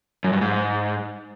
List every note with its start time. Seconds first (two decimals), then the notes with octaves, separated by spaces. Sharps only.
0.24 F#2
0.33 G2
0.41 G#2